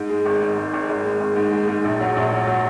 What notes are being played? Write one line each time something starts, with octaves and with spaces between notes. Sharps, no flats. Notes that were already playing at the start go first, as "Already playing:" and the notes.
Already playing: G#2
G#3
G#1
G#2
G#2
G#1
G#1
G#3
G#1
G#2
G#3
G#2
A#1
F#3
A#1
F#3
F#3